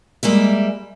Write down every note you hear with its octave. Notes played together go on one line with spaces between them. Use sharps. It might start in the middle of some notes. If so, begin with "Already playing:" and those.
G3 G#3 A#3 E5